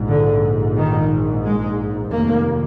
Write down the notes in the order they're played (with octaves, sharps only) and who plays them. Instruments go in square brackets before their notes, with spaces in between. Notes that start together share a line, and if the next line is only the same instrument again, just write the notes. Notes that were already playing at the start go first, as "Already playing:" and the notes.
Already playing: [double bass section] A#1 G#2
D3
D#3
G#3
F1 D#2 A#3